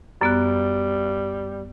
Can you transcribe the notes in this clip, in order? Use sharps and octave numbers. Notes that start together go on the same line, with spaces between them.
F#2 G3 B3 F#6